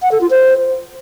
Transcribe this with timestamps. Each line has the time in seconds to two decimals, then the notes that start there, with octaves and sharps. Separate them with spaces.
0.02 F#5
0.11 A4
0.21 F4
0.30 C5